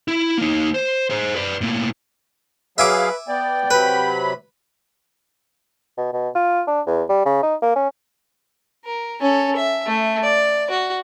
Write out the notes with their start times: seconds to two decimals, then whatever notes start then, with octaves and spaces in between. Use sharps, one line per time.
0.08 E4
0.38 A#3 D#4
0.74 C5
1.10 G#4 C5
1.36 B4 D5
1.61 A2 A#3
2.78 F#3 G#4 B4 E5 F5 G#5 D6
3.28 B3 D5 G5
3.71 C3 F#3 B4 B5
5.98 B2
6.13 B2
6.35 F4
6.68 D4
6.87 E2
7.09 G3
7.26 C#3
7.43 D#4
7.62 A#3
7.76 C#4
8.85 A#4
9.21 C#4 A4
9.56 E5
9.86 A3
10.23 D5
10.71 F#4